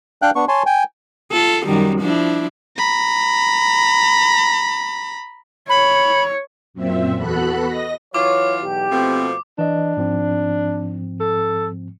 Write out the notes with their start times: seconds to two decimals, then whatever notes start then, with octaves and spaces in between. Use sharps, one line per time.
0.22 D4 F5 G5 F#6
0.35 B3 D4 C#6
0.48 C#5 G#5 A5 C6
0.66 G5 G#5
1.32 F4 A4
1.66 F#2 D#3 G3
2.00 F3 D4 E4
2.77 A#5 B5
5.69 C#5 B5
6.74 F#2 A#2 C4 E5
7.15 E2 B3 F#4 A4 B5 F#6
7.67 D#5 A#6
8.14 E3 F#3 F4 C#5 D6
8.61 B1 E2 G4
8.91 B2 F3 A3 C4
9.59 E3 D4 D#5
9.97 G#2 F3 C4
11.20 A4